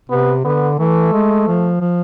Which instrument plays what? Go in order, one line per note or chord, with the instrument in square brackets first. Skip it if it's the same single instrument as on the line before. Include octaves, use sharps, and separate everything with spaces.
[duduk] C3 [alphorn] B3
[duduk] D3 [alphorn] B3
[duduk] E3 [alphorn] A3
[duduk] G#3
F3
F3